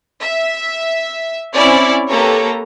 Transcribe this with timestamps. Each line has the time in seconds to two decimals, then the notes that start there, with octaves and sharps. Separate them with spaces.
0.20 E5
1.53 C4 C#4 E4 C#5 D5
2.09 A#3 G4 A4 B4 C#5 A#5